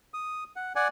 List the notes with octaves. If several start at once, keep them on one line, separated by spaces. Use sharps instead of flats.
D#6
F#5
D5 F#5 G#5